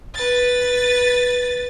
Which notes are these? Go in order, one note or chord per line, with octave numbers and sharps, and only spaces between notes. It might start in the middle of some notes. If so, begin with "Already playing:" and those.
B4 A6